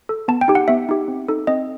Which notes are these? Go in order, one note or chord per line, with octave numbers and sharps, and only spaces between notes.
A4
B3 A5
G5
D#4 G4
F#5
B3 E5
D#4 G4
C4
D#4 A4
C4 D#5